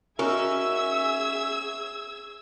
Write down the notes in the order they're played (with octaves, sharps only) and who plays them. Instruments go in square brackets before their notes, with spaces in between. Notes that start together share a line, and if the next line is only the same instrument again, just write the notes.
[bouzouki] C#4 [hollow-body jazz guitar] D#4 F#4 A#4 [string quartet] G#4 E6 G#6 [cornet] E5